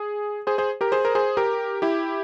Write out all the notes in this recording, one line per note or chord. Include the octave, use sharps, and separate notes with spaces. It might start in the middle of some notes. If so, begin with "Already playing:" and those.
Already playing: G#4
G#4 C5
G#4 C5
G4 A#4
G#4 C5
A#4
G#4 C5
G4 A#4
E4 G4